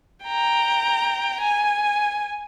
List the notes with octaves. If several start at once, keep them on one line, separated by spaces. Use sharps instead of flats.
G5 A#5
G#5